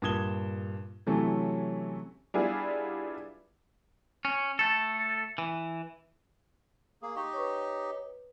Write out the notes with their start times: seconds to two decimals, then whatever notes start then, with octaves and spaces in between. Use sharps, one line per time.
0.02 G2 A#2 D#6 G#6 E7 G7
1.07 C3 E3 F#3 A3 C#4
2.34 G3 B3 D4 E4 F4 G#4
4.25 C#4
4.59 A3 A4
5.38 E3
7.02 A#3 G#4
7.16 D#4 G4 D#5 C#6
7.33 B4 C#5